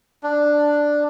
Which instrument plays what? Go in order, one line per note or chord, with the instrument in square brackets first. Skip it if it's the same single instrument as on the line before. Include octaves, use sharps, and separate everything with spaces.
[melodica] D4